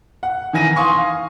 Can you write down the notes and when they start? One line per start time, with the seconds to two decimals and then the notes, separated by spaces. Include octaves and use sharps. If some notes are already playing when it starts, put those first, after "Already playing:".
0.23 F#5
0.53 D#3 E3 G#5 A#6 D#7
0.76 F5 G#5 C6 C#6 D#6
0.97 F5